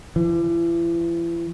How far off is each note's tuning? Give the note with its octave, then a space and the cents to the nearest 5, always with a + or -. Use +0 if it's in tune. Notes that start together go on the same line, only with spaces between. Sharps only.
E3 +40